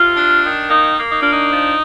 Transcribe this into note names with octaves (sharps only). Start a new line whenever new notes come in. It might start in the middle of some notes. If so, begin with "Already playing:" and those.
Already playing: C3 F4
D4
D#3
A#3 D#4
A#3
D#4
D4 F4
D#4
F3